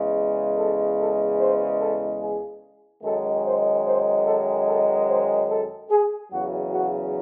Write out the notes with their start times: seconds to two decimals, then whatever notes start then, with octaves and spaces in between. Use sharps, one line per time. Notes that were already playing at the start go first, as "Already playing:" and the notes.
Already playing: E2 C#3 G#3
0.58 A4
0.98 A4
1.40 C5
1.80 A4
2.21 G#4
3.03 F#2 D#3 G#3 A4
3.44 C5
3.86 C5
4.26 A4
4.67 A4
5.08 C5
5.50 A4
5.90 G#4
6.31 E2 C#3 F#3 F#4
6.72 F#4